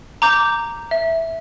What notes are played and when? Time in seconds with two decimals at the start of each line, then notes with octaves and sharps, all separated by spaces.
0.22 A#5 D6 G6
0.91 E5